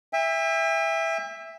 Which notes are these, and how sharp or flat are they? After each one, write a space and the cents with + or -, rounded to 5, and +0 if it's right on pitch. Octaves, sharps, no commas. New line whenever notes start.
E5 +0 G5 +45